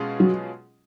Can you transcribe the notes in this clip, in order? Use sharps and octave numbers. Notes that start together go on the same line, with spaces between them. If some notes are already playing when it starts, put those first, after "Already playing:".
Already playing: B2 G#3 C#4 F4 G#4
F#3